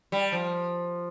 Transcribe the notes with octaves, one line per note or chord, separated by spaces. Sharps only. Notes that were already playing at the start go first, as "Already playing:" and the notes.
G3
F3